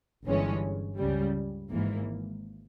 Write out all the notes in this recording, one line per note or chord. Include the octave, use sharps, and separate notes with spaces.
G1 G2 E3 G#3 C#4
C#2 C#3 G3
G#1 G#2 E3 A#3